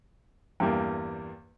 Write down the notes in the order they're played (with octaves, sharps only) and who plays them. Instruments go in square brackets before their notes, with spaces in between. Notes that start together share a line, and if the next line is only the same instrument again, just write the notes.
[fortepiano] E2 G2 G3 A#3